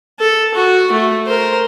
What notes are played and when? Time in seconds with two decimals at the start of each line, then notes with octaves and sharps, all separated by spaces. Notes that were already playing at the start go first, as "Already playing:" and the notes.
0.19 A4
0.54 F#4
0.92 A3
1.27 A#4 C5